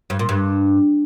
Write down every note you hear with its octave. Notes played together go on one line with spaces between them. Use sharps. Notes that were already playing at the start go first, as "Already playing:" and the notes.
G2
A#2
G2